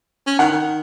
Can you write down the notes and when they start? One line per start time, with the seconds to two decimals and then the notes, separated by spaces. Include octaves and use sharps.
0.27 C#4
0.39 D#3 F#5
0.52 D#3